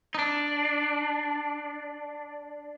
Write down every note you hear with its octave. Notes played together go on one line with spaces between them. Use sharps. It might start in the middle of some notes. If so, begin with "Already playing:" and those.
D#4
D4